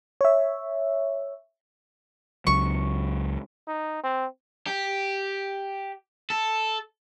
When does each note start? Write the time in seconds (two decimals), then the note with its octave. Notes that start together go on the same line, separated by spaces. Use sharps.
0.21 C#5 E5
2.47 C#2 F#3 C#6
3.67 D#4
4.03 C4
4.67 G4
6.30 A4